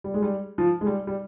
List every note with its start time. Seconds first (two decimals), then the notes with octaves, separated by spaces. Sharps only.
0.04 G3
0.14 G#3
0.22 G3
0.58 F3
0.81 G#3
0.86 G3
1.07 G3